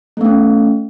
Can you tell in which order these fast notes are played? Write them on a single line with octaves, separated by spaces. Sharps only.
A3 B3 C#4